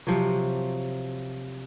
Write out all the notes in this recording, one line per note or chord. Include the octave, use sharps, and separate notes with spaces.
C3 F3 F#3